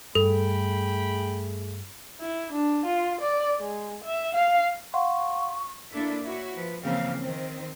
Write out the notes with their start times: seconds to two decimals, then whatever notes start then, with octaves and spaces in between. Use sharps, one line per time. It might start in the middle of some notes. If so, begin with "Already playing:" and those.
0.15 G2 A3 G#4 A4 G5 B5
2.21 E4
2.52 D4
2.86 F4
3.21 D5
3.60 G#3
4.04 E5
4.35 F5
4.94 F5 F#5 C6 C#6
5.91 A#3 D4 E4 A4 E5
6.22 E4 F#4 C#5
6.55 F3 B4
6.84 C#3 E3 F3 A#3 C4 F5
7.20 D#3 C4